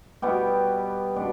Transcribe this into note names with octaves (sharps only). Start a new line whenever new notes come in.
B2 G3 B3 G4
B2 D4